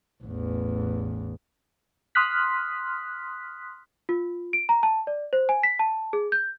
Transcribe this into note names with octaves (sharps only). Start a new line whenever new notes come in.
A1 E2
C6 D#6 F6 F#6 B6
F4
D7
A#5
A5
D5
C5
G#5
B6
A5
G#4
G6